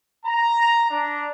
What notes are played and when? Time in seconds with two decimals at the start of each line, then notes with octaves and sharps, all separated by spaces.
0.25 A#5
0.90 D4